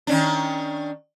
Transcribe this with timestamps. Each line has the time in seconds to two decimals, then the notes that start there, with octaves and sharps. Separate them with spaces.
0.07 D#3 C#4 D4